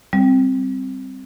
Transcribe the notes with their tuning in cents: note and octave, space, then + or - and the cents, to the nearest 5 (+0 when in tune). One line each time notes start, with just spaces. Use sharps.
G3 +0 C4 +0